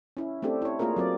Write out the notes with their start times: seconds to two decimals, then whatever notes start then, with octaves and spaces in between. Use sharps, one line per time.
0.17 C#4 E4
0.42 A3 C4 D4 G4 A4
0.62 E4 C#5
0.79 A3 A#3 F4 G#4 A#4
0.96 F#3 C4 D5